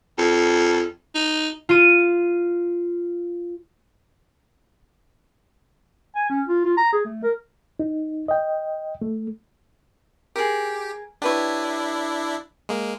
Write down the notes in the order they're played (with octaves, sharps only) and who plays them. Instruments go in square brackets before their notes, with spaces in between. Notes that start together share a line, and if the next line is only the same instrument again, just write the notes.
[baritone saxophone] F2
D#4
[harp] F4 D#7
[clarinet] G#5
C#4
F4
F4
A#5
G#4
A3
A#4
[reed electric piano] D#4
D#5 G5
A3
[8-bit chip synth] G4 [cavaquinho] G#4 A#4
[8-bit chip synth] D4 E4 [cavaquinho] G4 B4 C#5
[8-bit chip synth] G#3 A#3